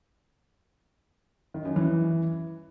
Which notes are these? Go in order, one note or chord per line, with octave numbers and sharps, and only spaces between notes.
D#3
F#2
E3